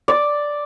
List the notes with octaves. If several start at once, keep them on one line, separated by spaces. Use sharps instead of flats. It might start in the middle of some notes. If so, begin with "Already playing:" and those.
D5